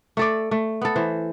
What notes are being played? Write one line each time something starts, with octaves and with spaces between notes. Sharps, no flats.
A3 A4 D5
A3
B3 A4
E3 C5